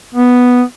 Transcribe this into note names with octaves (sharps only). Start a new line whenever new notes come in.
B3